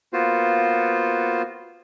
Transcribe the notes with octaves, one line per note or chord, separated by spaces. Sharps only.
A#3 B3 F4 F#4 C5